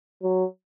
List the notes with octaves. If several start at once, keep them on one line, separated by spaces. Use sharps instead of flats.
F#3